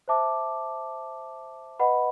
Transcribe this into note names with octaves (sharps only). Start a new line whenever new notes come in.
C5 E5 A5 D6
B4 D#5 F#5 B5